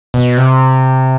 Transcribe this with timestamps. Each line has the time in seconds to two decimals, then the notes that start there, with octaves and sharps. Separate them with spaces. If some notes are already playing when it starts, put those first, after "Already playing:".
0.14 B2
0.37 C3